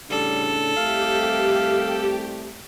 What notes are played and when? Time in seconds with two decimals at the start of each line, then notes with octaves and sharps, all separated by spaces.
0.10 A2 C#3 G3 D4 A4
0.77 C2 A3 G4 F5